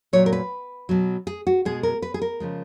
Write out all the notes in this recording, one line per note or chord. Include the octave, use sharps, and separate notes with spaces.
A#2 F#3 C#5
A#4
B4
B2 F#3
G#4
F#4
B2 G#3 G#4
A#4
B4
G#4
A#4
C#3 F3 G#3